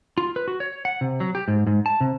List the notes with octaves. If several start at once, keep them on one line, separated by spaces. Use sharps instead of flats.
F4
B4
F#4
C#5
F#5
C3
F#3
G4
G#2
G#2
A5
C3